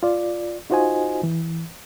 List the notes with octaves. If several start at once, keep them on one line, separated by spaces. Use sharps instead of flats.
F4 D5
D#4 F4 F#4 C5 D#5 G#5
E3